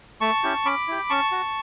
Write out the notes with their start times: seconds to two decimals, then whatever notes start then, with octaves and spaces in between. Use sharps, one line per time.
0.21 A3 A5 C#6
0.43 C#4 E4 G4
0.65 C#4 B5 D6
0.88 E4 G4
1.09 C#4 A5 C#6
1.32 F#4